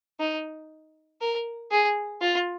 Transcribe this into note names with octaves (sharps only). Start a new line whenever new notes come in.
D#4
A#4
G#4
F4